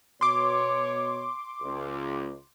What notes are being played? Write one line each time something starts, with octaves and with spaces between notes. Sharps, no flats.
B2 C#5 C6 D6
C#2